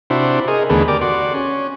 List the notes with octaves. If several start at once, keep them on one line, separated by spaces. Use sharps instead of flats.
C3 D4 E4 F#4 C5
G#4 A#4 D#5
D#2 D3 E3 A3 B3 G#4
G4 A#4 D5 D6
F#4 D5 C6
C#4